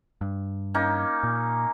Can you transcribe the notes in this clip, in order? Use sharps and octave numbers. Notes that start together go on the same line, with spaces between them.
G2
A#3 C#4 D#4
A#2